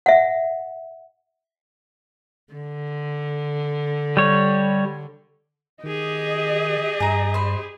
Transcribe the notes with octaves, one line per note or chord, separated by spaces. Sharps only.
E5 F#5
D3
G3 C#5
D#3 G4 G#4 D#5
G2 G#5 A#5
C5 B5